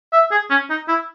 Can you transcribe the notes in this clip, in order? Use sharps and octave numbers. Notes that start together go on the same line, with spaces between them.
E5
G#4
C#4
D#4
E4